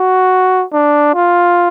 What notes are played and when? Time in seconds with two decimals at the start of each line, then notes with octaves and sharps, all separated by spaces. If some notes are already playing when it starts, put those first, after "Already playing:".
Already playing: F#4
0.73 D4
1.14 F4